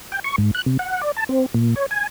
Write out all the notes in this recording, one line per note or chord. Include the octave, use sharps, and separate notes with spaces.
G5
C#6
G#2
F#6
C3
F#5
D5
A5
C4
A#2
C#5
G#5